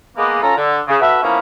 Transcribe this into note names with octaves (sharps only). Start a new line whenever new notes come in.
G#3 A#3 B3
C#4 F4 A4 A#5
D3
C#3
F#4 A4 B4 E5
F3 A#3 B3 C#4 E4 A#4